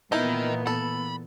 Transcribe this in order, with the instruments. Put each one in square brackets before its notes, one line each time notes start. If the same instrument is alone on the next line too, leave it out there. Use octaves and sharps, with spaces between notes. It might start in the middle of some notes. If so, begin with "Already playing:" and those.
[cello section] A#2 E3 B3 [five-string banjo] D#4 E4 [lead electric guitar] A#4 D#5
[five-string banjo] A4 [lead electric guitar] B5